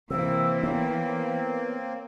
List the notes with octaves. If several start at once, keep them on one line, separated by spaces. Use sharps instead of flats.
C3 E3 A#3 C4 E6
B3 C#5